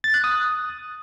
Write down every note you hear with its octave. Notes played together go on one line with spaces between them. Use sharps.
A6
F#6
D#6